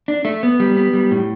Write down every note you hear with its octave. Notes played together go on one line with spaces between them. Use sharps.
D4
A3
B3
G3
B3
G3
A2